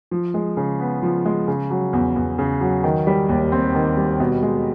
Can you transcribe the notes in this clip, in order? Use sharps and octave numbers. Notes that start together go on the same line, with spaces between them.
F3
G#3
C#3
B3
F3
G#3
C#3
F#3
E2
E2
C#3
F#3
D#3
G3
D#2
C4
D#3
G3
B2
G#3